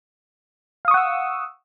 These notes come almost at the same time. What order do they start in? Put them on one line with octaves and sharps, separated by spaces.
F5 D#6 C#6 F#5 E6